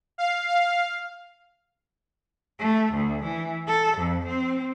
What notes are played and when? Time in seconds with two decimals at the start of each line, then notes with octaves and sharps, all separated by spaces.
0.18 F5
0.49 F5
2.59 A3
2.93 D2
3.24 E3
3.67 A4
3.97 F2
4.27 C4